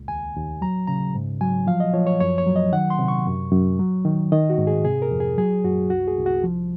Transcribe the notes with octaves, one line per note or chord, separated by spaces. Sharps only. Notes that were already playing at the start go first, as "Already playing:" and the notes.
Already playing: C#2
D#2 G#5
D#2
F#3 A#5
C#3 A#5
G#2
F#3 G#5
F3 F5
D#5
F3 C#5
C#5
F#2 C#5
C#5
F#3
D#5
D#3 F#5
C6
C3
C#6
F#2
F#2
F#3
D#3
D#3 D#5
F#4
G#2
G#4
C3 G#4
A#4
F2
G#4
F#3 G#4
F#2 F#4
C2 F#4
G#4
C2
F#4
F3